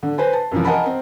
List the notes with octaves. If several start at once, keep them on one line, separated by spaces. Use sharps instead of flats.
D3
B4 C5 G#5
A5
F#2 C3 E3 F3
A#4 D#5 F#5 G#5 A5 B5
C4